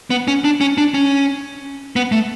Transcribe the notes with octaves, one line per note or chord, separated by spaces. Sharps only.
B3
C#4
D4
C#4
D4
C#4
B3
A3